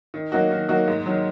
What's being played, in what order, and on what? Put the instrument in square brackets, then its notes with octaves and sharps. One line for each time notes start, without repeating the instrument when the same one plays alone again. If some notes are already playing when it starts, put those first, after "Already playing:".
[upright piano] D#3
F#3 A#3 D#4 F#4
D#3
F#3 A#3 D#4 F#4
G#2
D#3 F#3